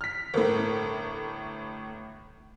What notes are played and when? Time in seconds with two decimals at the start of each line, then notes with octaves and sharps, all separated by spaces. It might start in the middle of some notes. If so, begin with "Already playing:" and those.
0.01 F6 B6
0.34 G1 A2 A4 A#4 C5